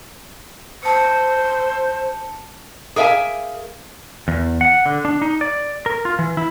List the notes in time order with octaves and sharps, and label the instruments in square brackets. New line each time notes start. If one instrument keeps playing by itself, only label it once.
[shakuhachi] C5 [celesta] A5 C#7
[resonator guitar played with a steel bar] G#4 A#4 E5 F5 G#5
[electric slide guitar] E2
F#5
D3
D4
D#4
D5
A#4
F4
E3
E4